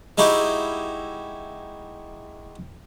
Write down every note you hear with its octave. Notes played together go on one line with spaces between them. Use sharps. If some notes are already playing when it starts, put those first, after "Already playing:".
G#3 D#4 E4 F#4 G4